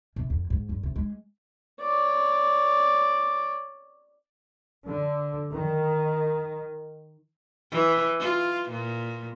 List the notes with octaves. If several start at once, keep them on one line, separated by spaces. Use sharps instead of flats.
C3
F2
G#2
G2
C3
G#3
C#5 D5
D3
D#3
E3
F4
A#2